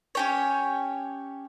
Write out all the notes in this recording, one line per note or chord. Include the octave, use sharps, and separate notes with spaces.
C#4 G4 C#5